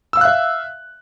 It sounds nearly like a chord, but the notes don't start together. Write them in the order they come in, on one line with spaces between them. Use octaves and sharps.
E6 F5 F#6 E5